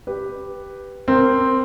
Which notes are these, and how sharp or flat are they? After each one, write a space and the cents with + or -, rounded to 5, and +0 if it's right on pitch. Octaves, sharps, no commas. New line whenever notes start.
G4 +0 B4 +0
C4 +0 A#4 -10